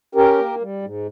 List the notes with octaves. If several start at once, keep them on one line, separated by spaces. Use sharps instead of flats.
C#4 G4 A#4
A#3
G3
G#2